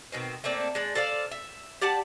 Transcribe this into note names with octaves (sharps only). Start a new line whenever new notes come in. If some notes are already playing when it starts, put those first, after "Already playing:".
B2 D#3 C4
A3 A#3 C4 D5
G#3 D4
A4 C5 D5 F5
E5
G4 D5 F#5 A5